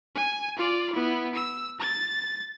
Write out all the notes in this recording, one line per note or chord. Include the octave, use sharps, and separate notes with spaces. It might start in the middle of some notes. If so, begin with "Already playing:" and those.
G#5
F4 D5
B3 E4
E6
A6